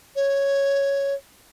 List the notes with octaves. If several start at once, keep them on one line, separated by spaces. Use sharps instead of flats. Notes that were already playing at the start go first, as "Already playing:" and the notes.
C#5